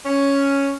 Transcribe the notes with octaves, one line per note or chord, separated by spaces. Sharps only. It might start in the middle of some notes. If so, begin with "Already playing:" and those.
C#4